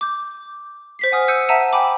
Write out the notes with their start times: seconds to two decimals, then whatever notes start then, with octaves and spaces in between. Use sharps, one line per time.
0.01 D6 G6
0.99 C5 B6 C7
1.12 F#5 G#5 D#6 F6
1.28 D#6 E6 G6 C#7 D#7
1.49 E5 F#5 A5 A#5 E6 D#7
1.73 G5 G#5 B5 D6